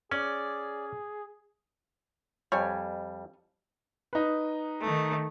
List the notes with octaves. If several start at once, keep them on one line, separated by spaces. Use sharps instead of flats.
C#4 G#4 D5
F2 G3 C#5 G#5
D#4 B4
D#3 A3